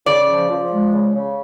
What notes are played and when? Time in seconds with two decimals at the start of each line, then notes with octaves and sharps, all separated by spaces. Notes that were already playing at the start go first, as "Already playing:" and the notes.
0.06 C#3 D5
0.29 F3
0.50 F3
0.72 G#3
0.94 C#3
1.15 C#3